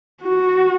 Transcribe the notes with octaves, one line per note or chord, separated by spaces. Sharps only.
F#4